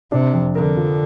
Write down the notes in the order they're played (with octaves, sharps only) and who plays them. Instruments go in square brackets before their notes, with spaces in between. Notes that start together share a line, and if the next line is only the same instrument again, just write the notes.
[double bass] C3 [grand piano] D4
[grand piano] F2
[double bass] D3 [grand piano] A#4
[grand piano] F3